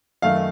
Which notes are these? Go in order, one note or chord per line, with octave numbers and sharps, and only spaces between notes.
F#2 D#3 A3 F5